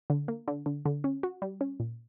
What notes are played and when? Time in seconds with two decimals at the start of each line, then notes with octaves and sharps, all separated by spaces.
0.10 D3
0.28 A#3
0.48 D3
0.66 D3
0.86 D3
1.04 C#4
1.23 F#4
1.42 G3
1.61 C#4
1.80 A#2